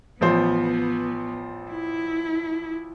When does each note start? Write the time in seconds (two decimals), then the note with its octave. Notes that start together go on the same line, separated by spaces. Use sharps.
0.21 A1 F3 B3 C5
1.71 E4